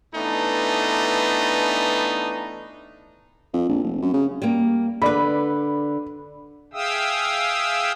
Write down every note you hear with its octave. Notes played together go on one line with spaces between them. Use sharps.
E3 A3 B3 D4 D#4
F2
A#1
F1
F#2
C#3
G3 A#3
D3 B4 D5 B5
G#4 E5 F5 G5 D#6 E6